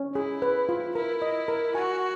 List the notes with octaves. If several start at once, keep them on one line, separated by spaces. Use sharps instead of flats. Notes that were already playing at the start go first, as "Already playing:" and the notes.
Already playing: C#4
E4 G#4
B4
F4
E4 A#4
D#5
A#4
F#4 G#5